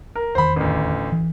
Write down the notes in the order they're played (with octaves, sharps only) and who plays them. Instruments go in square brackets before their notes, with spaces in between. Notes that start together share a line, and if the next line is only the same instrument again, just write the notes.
[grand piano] A#4
[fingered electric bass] F1 E2 D#3 [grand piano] C5 B5
[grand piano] A1 D2
[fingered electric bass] E3